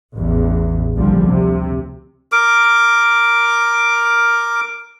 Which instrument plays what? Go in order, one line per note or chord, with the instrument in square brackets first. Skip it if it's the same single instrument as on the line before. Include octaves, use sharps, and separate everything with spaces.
[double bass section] A1 E2
C2 A#2 D3 F3 G3
D2 C3
[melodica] A#4 D6